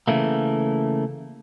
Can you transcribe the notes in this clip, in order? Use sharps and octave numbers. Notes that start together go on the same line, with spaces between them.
C#3 E3 A3 A#3